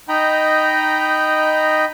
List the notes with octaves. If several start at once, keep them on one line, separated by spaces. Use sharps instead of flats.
D#4 D#5 G5 A#5 B5